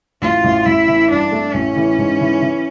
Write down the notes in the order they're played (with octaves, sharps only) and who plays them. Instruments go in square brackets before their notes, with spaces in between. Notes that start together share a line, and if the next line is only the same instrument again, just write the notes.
[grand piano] A1 [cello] F4
[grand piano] A1
[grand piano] A1 [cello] E4
[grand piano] E3
[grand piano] G2 [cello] D4
[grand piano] A3
[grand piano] A1 [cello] C#4
[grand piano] E3
G#2
E3
E3